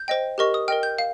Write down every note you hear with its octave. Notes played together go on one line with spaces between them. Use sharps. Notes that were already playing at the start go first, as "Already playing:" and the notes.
Already playing: G6
C5 D#5 G5
G4 A#4 D#5 C#6
D#6
A#4 D#5 G5 F6
G6
F5